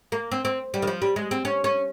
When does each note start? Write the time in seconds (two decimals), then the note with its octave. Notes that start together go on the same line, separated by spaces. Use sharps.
0.12 A#3
0.32 C4
0.45 C4
0.74 G3
0.82 D#3
0.87 F3
1.02 G3
1.16 G#3
1.31 C4
1.45 C#4
1.64 C#4